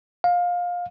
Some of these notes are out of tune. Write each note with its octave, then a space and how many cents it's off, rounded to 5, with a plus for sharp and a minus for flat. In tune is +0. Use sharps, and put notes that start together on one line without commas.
F5 +20